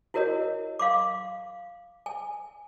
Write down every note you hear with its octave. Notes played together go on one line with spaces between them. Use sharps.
E4 F#4 A#4 C#5 D#5
F5 C6 D6
G#5